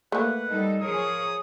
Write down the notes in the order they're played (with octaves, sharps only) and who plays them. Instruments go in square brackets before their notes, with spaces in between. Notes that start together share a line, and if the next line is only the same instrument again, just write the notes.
[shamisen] A3 A#3 [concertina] B4 F#5
[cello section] G3 D#4 A4
[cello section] F3 G#4 C#5 [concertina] A#4 [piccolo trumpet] D#6